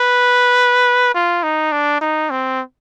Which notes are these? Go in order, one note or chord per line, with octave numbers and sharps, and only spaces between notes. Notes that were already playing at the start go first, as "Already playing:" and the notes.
Already playing: B4
F4
D#4
D4
D#4
C4